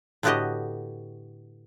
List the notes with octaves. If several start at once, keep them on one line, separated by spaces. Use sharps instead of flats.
A2 D3 B3 F#4 G4 D#5